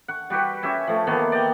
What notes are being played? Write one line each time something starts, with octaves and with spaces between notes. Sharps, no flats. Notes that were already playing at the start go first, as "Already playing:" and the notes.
F#5 C#6
G3 F#4 G4 B4
C#4 G4 E5 G#5
F3 A3
D#3 E3 A#3 B3
D5 D#5 G5